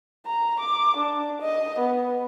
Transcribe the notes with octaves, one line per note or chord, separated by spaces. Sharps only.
A#5
D6
D4
D#5
B3